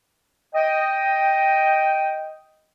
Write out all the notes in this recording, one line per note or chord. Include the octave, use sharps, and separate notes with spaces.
D#5 G5